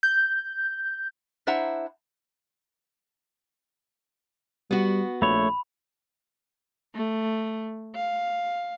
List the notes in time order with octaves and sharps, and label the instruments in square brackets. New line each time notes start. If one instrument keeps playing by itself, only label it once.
[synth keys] G6
[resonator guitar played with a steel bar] D4 E4 C5 E5 F#5 A#5
[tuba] G3 [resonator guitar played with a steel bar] B3 F#4
[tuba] A#1 [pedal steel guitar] A3 C#5 [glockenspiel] B5
[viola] A3
F5